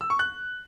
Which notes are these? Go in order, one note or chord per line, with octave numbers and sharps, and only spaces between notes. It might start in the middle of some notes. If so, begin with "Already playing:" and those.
E6
C#6
F#6